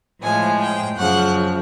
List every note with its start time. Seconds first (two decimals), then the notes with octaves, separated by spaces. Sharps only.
0.22 A2 F3 G#3 G#5
0.60 G5
0.98 F#2 C#3 F3 F#5